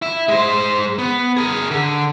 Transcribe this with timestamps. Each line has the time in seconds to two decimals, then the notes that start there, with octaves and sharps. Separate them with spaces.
0.02 E4 E5
0.29 G#3 C5
0.98 B3
1.37 G#4 A#4
1.71 D3